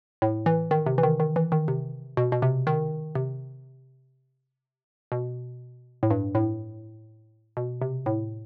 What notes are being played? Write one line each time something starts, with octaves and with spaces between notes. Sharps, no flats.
A2
E3
D#3
C3
E3
D#3
D#3
E3
D#3
C3
B2
B2
C3
D#3
C3
B2
A2
G2
A2
B2
C3
A2